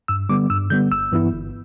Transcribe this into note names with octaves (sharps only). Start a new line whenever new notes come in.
G2 E6
D3 G3 B3 D6
G2 E6
D3 G3 B3 G6
G1 E6
G2 E3 B3 E4
G1